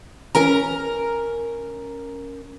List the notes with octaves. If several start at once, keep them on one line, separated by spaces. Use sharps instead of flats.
C#4 A#4 A#5